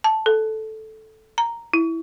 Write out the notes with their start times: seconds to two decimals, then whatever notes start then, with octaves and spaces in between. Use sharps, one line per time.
0.04 A5
0.26 A4
1.38 A#5
1.74 E4